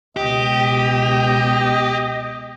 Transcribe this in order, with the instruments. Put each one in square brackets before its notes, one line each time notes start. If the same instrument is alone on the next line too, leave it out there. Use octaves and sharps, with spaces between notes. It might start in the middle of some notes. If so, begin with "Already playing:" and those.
[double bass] C#2 B2 [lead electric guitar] G4 [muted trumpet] D#5